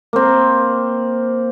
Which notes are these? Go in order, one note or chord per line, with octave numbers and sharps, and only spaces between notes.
A#3 C4